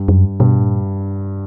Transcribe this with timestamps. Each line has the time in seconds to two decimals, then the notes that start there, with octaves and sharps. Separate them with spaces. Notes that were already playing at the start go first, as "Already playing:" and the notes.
Already playing: G2
0.08 F#2
0.40 G2 B2
0.60 A#2